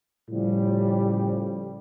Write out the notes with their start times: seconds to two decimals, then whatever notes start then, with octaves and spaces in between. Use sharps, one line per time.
0.30 A2 C#3 F3 G3